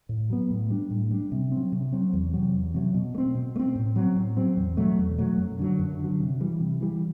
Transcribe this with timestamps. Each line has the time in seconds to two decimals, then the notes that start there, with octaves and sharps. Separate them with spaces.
0.09 A2
0.30 F#3 B3
0.50 A2
0.70 G3 D4
0.91 A2
1.11 G3 D4
1.32 C3
1.52 F#3 C4
1.72 C3
1.92 F#3 C4
2.13 E2
2.34 C3 F#3
2.54 E2
2.74 C3 F#3
2.94 B2
3.15 A3
3.18 C4
3.35 B2
3.56 A3
3.59 C4
3.75 A2
3.96 F#3 C4
4.16 A2
4.37 F#3 C4
4.57 E2
4.77 B2 F#3 A3
4.98 E2
5.18 B2 F#3 A3
5.38 F#2
5.59 D3 F#3
5.79 F#2
5.99 D3 F#3
6.20 C3
6.41 E3 G3
6.60 C3
6.81 E3 G3